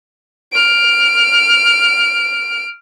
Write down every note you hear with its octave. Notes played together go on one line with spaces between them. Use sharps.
F6 D7